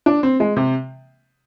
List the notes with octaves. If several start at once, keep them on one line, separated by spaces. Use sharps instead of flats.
D4
C4
G#3
C3